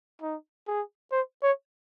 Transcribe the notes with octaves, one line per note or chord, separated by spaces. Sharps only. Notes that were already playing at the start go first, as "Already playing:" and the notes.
D#4
G#4
C5
C#5